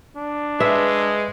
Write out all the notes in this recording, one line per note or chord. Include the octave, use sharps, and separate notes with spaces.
D4
G#3 B4 E5